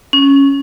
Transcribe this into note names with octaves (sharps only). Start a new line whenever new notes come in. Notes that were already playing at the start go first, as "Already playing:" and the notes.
C#4